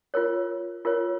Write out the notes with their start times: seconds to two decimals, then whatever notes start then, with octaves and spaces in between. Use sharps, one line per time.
0.14 F4 A#4 C#5
0.85 F4 A#4 C#5